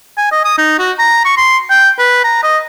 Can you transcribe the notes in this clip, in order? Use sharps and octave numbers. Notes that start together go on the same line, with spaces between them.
G#5
D#5
D#6
D#4
F#4
A#5
C#6
C6
G5
B4
A#5
D#5